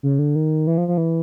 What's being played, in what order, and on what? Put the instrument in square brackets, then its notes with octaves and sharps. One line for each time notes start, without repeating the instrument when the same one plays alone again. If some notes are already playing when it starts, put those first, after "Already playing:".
[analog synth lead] C#3
D3
D#3
E3
F3
F3
E3